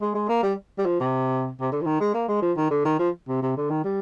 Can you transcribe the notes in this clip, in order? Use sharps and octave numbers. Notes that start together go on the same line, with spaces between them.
G#3
G#3
A#3
G3
G3
F3
C3
C3
D3
F3
D#3
G#3
A#3
G#3
F3
D#3
D3
D#3
F3
C3
C3
D3
D#3
G3